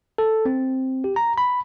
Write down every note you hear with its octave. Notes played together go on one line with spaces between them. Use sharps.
A4
C4
G4
A#5
B5